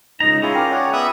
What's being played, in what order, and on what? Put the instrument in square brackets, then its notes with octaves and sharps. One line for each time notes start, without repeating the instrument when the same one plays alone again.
[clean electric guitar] C#2 A#5 [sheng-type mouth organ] D#4
[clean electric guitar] C#4 F4 [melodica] E4 [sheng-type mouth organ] G#4
[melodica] A#4 [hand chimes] G5 D6
[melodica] C#5 D5 F#5
[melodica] B3 [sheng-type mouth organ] E5 B5 D#6